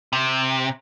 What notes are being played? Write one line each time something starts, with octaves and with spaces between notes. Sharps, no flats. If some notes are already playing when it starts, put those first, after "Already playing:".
C3